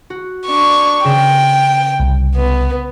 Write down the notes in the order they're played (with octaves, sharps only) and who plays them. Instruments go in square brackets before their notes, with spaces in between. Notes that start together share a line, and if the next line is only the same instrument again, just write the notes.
[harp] F#4
[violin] D4 C#6
[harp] C#3 A#6 E7 [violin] G5
[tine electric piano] C2
[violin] B3